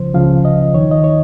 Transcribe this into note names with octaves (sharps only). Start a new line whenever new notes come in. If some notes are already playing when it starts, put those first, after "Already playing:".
Already playing: C#2 C#3 F3 C5
C#2 C#3 F3 F5
D#5
D#2 D#3 C#5
D#5
C#5